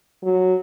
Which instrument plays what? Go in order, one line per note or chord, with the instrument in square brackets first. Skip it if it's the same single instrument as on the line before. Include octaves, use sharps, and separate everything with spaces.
[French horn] F#3